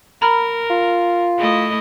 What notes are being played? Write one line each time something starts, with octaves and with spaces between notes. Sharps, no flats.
A#4 A#5 B5 F6
F4
A3 E4 D#5